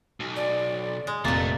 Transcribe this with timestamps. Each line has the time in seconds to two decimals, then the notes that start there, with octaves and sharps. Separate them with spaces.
0.20 B1
0.36 D5
1.07 G#3
1.25 F1 C2 A#2 A3 A#3 A6